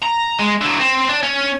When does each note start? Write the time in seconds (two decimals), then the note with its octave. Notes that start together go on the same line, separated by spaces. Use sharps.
0.03 A#5
0.39 G#3
0.61 D3 F#3
0.80 C4
1.09 D4
1.23 C#4